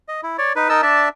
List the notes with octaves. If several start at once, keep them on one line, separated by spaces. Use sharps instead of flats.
D#5
E4
C#5 D5
D#4 B4
D#4 A#4 D#5 A5 E6
D4 D5 E5 A5